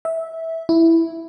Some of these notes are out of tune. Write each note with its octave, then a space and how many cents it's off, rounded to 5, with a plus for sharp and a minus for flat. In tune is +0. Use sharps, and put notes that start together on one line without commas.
E5 -15
E4 +0